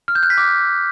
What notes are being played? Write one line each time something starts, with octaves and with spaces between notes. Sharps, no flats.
F6
G6
F#6
B6
D6